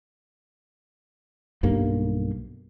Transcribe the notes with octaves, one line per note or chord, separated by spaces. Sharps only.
B1 G2 G3 A#3